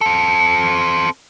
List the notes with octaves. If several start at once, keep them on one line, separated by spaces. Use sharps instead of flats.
C4 A4